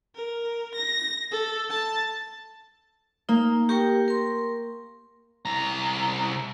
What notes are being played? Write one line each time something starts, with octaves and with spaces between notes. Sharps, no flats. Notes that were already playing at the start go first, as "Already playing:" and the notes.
A#4
A#6
A4
A5
A#3 D#4
G4 A#4 G5 C#6
A#4 C6
C2 A#5